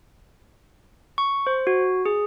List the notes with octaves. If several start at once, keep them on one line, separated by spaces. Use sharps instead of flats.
C#6
C5
F#4
G#4